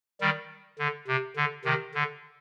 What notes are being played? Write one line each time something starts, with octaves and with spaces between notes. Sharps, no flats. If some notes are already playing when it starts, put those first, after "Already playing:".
D#3 G3
D3
C3
D3
C3 D#3
D3